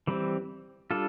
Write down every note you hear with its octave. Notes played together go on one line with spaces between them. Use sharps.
E3 G3 C4
G3 D4 F4 A4